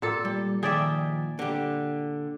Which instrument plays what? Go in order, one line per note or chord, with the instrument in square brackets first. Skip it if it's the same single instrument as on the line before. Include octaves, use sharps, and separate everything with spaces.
[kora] A#2 A4
[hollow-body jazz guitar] G3
[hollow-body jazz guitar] D#3 F3 G5 [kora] G#4 D5 E5
[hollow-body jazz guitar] D3 G4